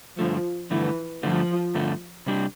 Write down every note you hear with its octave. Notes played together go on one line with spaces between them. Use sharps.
G2 D3 F3 A3
G2 D3 E3 A3
G2 D3 F3 A3
G2 D3 A3
C3 G3 D4 G4